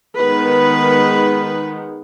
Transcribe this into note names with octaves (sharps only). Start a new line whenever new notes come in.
D#3 G#3 B3 B4